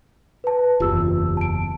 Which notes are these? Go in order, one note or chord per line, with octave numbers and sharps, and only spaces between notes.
B4 A5
F#1 E2 F4 G4 E6
A5 D7